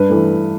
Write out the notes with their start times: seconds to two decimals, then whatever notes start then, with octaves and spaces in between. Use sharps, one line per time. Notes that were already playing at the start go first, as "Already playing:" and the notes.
Already playing: G2 B4
0.09 E3 A3